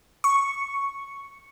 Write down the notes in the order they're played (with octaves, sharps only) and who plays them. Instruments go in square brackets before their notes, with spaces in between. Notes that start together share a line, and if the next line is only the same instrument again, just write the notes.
[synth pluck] C#6